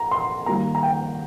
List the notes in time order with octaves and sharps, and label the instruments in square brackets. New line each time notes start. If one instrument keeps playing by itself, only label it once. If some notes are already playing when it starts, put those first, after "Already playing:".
Already playing: [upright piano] A#5
C6
D#3 G3 A#3 A#5
A#5
G5